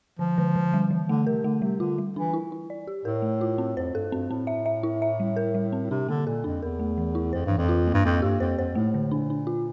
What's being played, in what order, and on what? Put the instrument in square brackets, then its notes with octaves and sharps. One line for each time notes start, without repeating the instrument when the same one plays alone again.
[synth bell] D3 [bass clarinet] F3
[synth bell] D3
D3
G3
E3
[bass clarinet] D3 [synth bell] A3
[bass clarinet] C3 [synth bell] A#4
[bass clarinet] D3 [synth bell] A3
[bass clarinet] C3 [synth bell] G3
[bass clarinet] D3 [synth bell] F4
[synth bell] G3
[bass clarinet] E3 [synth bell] D4
[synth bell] E4
E4
D5
G4
[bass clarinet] A2 [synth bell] A#4
[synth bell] A3
F4
C4
[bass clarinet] F2 [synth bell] C5
[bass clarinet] G2 [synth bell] A4
[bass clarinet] G2 [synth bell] C4
[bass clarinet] A2 [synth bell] C4
[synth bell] E5
E5
E4
E5
G3
A#4
G3
C4
[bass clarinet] C3 [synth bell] D4
[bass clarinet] D3 [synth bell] A#3
[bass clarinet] A#2 [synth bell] A4
[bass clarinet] F2 [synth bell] D4
[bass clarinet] E2 [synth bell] A#4
[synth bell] A3
E3
E4
[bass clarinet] F2 [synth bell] C5
[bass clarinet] G2
[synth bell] E3
[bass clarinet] F2
[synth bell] F4
A#3
[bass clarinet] G2
[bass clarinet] F2 [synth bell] A#3
[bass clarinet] G2 [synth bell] G4
[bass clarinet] F2 [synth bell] C5
[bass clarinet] F2 [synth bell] C5
[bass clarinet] A2 [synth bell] A3
[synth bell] D3
[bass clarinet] A#2 [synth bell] D4
[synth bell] D4
F4